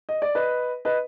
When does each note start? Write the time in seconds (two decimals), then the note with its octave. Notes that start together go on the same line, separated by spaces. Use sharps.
0.09 D#5
0.22 D5
0.35 B4 D#5
0.85 B4 D#5